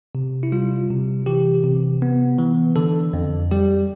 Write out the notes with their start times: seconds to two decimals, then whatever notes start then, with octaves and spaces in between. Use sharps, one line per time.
0.15 C3
0.43 E4
0.52 G3 F4
0.90 C3
1.26 E3 G4
1.64 C3
2.02 B3
2.38 E3
2.76 D3 A4
3.13 F2
3.51 G3 G4